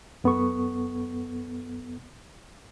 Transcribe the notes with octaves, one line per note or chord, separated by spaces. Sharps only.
F#2 B3 A4 C#6